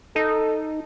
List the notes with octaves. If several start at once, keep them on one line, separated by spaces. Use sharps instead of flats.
D#4 A4